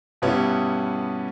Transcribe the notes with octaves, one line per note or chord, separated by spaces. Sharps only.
G2 B2 G3 B3 C#4 E4